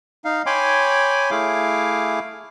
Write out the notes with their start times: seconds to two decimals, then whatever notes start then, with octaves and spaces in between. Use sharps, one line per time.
0.25 D#4 F5
0.46 C#5 G5 G#5 B5 C6 D6
1.31 A3 E4 G#4 F5 D6